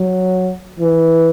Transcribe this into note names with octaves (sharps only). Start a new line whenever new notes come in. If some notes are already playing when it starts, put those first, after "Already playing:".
Already playing: F#3
E3